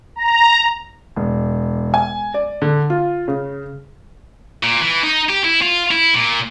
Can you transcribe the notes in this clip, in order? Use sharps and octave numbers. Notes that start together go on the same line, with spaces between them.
A#5
E1
G#5
D5
D3
F4
C#3
A#2
E3
D#4
G4
E4
F4
E4
A#2